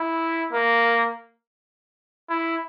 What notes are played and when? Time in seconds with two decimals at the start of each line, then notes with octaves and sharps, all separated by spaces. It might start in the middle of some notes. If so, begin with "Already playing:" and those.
Already playing: E4
0.52 A#3
2.29 E4